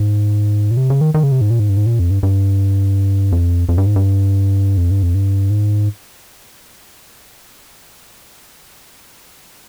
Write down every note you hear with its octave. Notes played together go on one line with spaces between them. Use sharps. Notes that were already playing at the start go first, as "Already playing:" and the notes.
Already playing: G#2
A#2
C3
C#3
D#3
D#3
C#3
C3
G#2
A#2
G#2
G2
G#2
A#2
F2
G2
G2
F2
F2
G2
G#2
G2
F2
G2
F2
G2
G#2